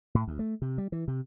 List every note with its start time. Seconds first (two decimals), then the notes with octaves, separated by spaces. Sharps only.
0.15 A2
0.27 D2
0.39 A3
0.62 C3
0.78 G3
0.92 E3
1.08 C3